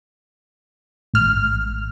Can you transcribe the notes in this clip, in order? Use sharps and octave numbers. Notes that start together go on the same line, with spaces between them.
A1 F6